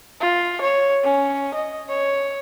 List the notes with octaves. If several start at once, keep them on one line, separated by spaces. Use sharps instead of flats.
F4
C#5
C#4
D#5
C#5